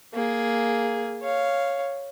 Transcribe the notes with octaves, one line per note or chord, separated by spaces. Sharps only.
A#3 G#4
C#5 F5